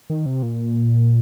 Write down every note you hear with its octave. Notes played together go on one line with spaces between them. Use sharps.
D#3
C3
A#2